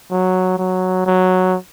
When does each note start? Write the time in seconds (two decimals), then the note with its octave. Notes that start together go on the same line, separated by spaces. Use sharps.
0.12 F#3
0.58 F#3
1.06 F#3